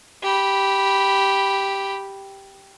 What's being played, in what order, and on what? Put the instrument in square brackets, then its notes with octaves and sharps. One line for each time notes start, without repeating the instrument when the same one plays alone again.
[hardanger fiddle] G4 B5